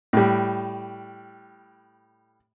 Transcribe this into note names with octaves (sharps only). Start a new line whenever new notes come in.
A2 G3